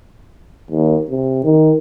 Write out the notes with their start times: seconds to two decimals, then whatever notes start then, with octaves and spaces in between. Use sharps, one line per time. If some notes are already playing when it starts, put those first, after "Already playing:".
0.71 D#2
1.10 C3
1.44 D#3